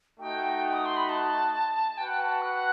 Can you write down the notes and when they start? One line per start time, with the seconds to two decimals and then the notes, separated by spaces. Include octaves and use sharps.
0.19 A3 D#4 F#4 G5
0.73 D#6
0.85 C6
0.97 B5
1.09 A5
1.97 F#4 B4 F#5 G5
2.20 A5
2.42 F#6